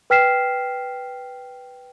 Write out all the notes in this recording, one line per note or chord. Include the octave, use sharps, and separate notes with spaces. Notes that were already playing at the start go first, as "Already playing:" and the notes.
B4 G5 F6 B6 C7 E7